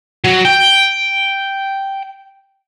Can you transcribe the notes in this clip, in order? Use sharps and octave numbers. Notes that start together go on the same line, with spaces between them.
F#3
G5